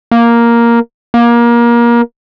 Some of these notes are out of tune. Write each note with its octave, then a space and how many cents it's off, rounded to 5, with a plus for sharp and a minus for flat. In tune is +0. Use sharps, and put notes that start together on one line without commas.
A#3 +5
A#3 +25